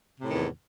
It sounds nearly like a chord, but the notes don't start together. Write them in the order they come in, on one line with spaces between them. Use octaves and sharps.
C3 A2 D#3 E2